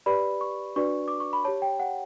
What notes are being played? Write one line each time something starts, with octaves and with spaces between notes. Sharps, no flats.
G4 B4 D5 B5
C#6
D4 F#4 B4 D5 C#6
D6
C#6
B5
G4 C#5 A5
G5
F#5